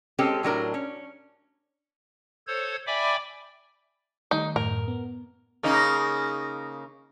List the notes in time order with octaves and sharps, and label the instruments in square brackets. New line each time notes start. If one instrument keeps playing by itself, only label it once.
[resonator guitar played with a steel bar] G#3 C4 C#4 G4 A4
A2 F#3 D4 A#4
C#4
[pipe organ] A4 C5 C#5 G#6
D5 E5 G5 G#5 B5 D6
[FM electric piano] D#3 G3 A3 [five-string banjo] D#4
[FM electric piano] F#2 A2 [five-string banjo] A#4
[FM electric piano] B3
[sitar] C#3 A#3 D#4